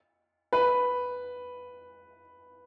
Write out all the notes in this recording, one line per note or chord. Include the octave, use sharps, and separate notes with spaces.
B4